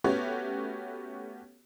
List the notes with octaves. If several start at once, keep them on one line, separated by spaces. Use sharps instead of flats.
A3 B3 C#4 F#4 G4 C#5